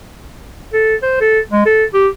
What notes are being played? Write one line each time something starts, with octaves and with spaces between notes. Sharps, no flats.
A4
C5
A4
G#3
A4
G4